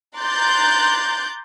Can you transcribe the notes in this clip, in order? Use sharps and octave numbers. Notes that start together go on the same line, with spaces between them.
A#5 C6 D6 F#6 G6 A6